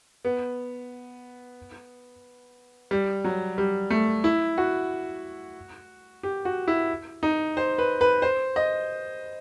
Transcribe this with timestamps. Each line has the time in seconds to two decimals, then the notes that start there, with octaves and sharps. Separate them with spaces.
0.25 B3
2.91 G3
3.24 F#3
3.58 G3
3.90 A3
4.24 E4
4.58 F#4
6.23 G4
6.45 F#4
6.68 E4
7.23 D#4
7.57 C5
7.78 B4
8.01 B4
8.22 C5
8.56 D#5